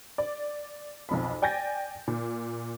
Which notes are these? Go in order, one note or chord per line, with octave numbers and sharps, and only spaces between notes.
D5
B1 F2 B5
D5 G5 G#5 G6 A6 A#6
A#2